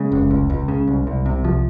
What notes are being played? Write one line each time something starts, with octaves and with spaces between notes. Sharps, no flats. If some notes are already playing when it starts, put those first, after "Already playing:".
Already playing: C#3 G#3
F1
C#2
C#2
C#3
C2
C2
C3
C2 F3